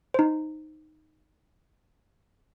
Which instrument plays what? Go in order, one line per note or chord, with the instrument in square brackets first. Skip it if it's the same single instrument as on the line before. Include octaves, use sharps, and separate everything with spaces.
[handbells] D#4 C5